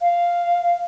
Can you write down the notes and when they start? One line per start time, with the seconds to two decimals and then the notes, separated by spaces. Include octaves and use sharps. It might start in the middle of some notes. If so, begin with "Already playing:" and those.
0.01 F5